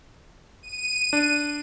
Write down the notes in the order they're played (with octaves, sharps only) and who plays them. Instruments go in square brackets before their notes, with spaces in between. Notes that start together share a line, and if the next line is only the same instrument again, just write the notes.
[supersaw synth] D#7
[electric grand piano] D4